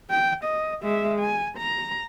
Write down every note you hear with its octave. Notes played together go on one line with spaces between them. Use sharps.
G5
D#5
G#3 E5
G#5
A#5